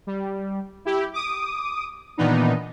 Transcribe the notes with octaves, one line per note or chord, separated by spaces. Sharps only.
G3
E4 G4
D6 D#6
A#2 D#3 E3 B3 D4 D#4